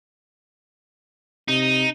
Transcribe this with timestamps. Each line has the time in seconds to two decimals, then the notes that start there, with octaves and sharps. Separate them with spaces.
1.48 C3 D#4